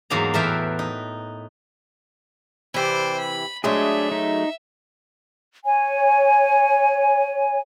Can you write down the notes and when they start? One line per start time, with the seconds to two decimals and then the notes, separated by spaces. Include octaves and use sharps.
0.10 E2 G#2 F#3 A#3 A#5
0.34 A2 E3 A#4 B4 E5 G5
0.79 D#4
2.74 C3 E3 C5 D5
3.18 B5
3.64 F#3 G#3 A3 D4 G#4 E5
4.12 D#4
5.65 C#5 G#5